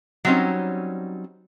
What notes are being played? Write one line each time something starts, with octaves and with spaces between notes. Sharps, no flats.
F#3 G3 C4 C#4 D#4